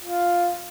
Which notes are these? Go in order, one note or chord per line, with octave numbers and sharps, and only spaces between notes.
F4